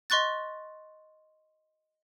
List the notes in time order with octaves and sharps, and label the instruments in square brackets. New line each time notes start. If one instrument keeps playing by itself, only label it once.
[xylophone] D#5 C6 C#6 F#6 A6